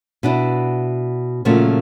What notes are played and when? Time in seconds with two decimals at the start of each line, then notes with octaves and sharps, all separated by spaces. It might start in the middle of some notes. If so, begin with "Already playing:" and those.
0.23 B2 D4 E4
1.45 A#2 C#3 F3 F#3 A3 A#3